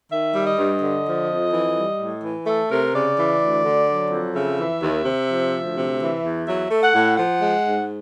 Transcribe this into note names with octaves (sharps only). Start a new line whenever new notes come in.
D#3 E5
G3
D#5
G2
D3
F3
F2
E3
G3
A2
E3
A3 A4
C3 A#4
C#3 D5
E3
D2
D3
F#3
F2
C#3 E5
E3
D#2
C3
F3
D2
C3
E3
E2
F#3 E5
A3
F#5
A2
F3 F#5
G#3
G#2